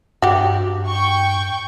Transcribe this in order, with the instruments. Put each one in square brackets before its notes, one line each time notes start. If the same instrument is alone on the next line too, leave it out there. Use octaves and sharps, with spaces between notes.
[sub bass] G2 [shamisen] F#4 G4
[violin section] G5 C#6